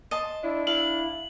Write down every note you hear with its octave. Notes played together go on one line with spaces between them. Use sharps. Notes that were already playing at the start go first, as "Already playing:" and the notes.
D#5 A5 C6
D4 E4
E4 F5 F#7